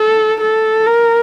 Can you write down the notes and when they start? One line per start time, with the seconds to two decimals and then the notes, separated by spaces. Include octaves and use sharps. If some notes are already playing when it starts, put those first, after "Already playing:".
Already playing: A4
0.41 A4
0.87 A#4